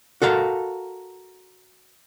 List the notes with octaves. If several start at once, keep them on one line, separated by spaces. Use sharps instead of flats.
F#4 A4 A#4 F5